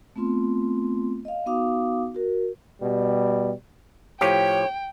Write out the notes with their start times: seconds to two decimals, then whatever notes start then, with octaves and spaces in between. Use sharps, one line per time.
0.16 A3 B3 C4 F4 C6
1.25 D#5 F5
1.46 B3 D#4 F#4 F5 D6 D#6
2.14 F#4 A#4
2.81 B2 G3
4.21 A2 F3 G4 C#5 G5